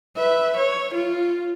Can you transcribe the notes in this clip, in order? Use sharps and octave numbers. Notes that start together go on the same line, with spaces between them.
B4 E5
C#5
F4